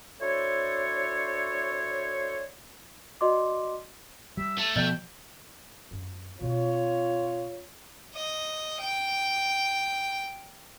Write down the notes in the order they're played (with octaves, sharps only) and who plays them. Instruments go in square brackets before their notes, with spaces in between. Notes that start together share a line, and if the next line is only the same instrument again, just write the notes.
[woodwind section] D4 E4 F#4 A4 C5 C#5
[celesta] F#4 D5 D#5 C6 D6
[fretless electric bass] G3 [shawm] E5
[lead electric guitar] A3 [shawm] A5
[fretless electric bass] B2 [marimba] F3 A6 [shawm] G5
[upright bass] F#2
[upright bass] B2 C4 [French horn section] F4 C#5
[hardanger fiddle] D#5
G5